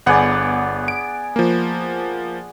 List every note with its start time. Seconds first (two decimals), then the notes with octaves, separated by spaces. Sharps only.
0.06 G1 B3 G#4 D5 F#5
0.88 D7
1.36 F3 A#3